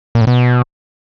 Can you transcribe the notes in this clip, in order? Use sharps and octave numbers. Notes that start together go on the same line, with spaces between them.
A#2
A2
B2